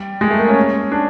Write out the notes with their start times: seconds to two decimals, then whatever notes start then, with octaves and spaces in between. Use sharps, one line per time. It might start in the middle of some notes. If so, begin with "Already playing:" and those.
Already playing: G3
0.21 G#3
0.31 A3
0.38 A#3
0.48 C#4
0.92 D4